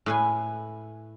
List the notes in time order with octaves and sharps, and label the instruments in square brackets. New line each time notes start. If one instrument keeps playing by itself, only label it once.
[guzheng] A2 B4 G#5